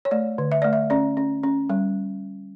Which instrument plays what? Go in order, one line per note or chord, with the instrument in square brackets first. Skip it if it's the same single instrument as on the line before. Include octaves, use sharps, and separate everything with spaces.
[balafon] C#5
A3 D5
D3
E5
A3 D5
E5
C#4 D5
C#4
C#4
G3